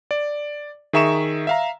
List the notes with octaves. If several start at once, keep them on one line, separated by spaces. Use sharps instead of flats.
D5
D#3 G#4 E5 A#5 C#6 E7
E5 F5 A#5